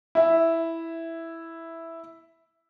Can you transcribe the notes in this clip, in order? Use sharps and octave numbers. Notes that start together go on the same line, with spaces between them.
E4 E5